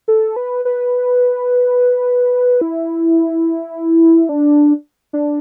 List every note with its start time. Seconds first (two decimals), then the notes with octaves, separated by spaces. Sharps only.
0.08 A4
0.36 B4
0.65 B4
2.61 E4
4.29 D4
5.13 D4